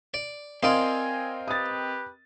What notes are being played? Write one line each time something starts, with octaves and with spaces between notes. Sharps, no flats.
D5
C4 F4 A#4 D5 D#5 G#5 C6 D#6
G4 B4 D#6 A6